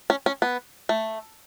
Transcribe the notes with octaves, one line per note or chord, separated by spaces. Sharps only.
C#4
C#4
B3
A3